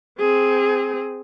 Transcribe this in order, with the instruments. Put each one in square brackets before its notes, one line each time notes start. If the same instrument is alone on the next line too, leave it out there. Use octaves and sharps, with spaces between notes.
[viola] C4 G#4